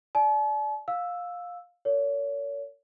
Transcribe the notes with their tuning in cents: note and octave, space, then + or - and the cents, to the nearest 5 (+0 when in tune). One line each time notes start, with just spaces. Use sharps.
D5 +0 A5 -45
F5 +20 E6 +0
A#4 -30 C#5 +35